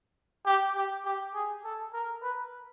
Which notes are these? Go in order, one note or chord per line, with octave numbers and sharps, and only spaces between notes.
G4
G4
G4
G#4
A4
A#4
B4